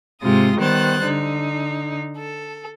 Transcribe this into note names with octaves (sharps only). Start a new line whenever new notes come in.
G#2 C3 G#3 F4 D#6 A#6
D#3 G3 B3 C5 F#6 A6
D3 D#4
A4